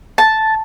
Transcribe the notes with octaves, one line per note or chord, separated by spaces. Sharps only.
A5